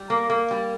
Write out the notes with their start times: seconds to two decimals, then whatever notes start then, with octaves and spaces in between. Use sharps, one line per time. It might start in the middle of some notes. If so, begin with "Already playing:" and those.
Already playing: G3
0.10 A#3
0.30 A#3
0.51 G3